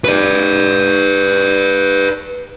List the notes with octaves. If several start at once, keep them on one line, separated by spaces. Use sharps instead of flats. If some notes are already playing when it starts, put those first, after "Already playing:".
B4 D5